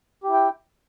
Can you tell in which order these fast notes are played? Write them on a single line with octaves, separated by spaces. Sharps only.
G4 E4 G5